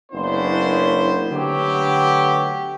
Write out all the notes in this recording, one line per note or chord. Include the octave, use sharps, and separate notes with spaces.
F#1 B3 C#4 D4 E4 C5
D3 F#3 A3 B3 G4